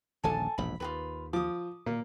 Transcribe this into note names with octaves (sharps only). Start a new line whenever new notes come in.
D#1 A#1 D3 A4 G#5 A5
E1 A#1 G#2 B5
D#2 F4 F#4 B4
F3 D6 D#6
A#2 A#3